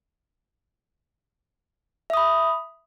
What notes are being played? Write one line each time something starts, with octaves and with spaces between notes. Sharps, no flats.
E5 B5 D#6